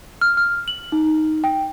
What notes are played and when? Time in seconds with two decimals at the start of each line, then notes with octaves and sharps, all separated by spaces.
0.21 F6
0.37 F6
0.68 F#7
0.92 D#4
1.44 G5